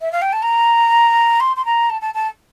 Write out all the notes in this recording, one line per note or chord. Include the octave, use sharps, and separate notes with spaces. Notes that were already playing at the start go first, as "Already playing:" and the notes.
E5
F5
G5
A5
A#5
C6
C6
A#5
A5
A5
A5